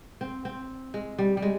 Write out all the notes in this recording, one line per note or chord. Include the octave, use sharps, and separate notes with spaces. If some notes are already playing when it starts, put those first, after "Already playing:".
C4
C4
G#3
G3
G3
G#3